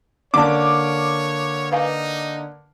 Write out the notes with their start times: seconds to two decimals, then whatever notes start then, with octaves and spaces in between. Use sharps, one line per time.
0.34 D3 A#3 C#4 C#5 D5 A5 D6
1.72 D#4 B4 F5 G#5